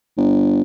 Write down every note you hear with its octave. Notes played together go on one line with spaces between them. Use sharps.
G1